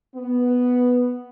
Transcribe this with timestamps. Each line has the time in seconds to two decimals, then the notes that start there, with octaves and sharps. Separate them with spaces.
0.15 B3